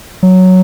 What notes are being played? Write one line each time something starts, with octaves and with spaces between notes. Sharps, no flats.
F#3